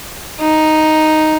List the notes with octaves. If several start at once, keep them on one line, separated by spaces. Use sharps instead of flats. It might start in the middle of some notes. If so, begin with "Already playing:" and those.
D#4